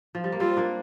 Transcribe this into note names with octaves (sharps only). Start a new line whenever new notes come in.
F3
G3
A#3
G3 C4 F4
A#3 D4